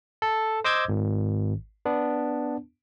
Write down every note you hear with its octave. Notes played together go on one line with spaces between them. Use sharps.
A4
C5 D#5 D6 E6 G6 G#6
G#1
B3 D4